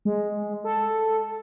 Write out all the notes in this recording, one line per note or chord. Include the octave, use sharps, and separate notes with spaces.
G#3
A4